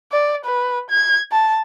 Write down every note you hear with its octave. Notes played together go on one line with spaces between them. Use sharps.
D5
B4
G#6
A5